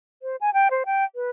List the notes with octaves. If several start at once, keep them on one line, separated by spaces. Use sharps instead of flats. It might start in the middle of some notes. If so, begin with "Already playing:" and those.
C5
G#5
G5
C5
G5
B4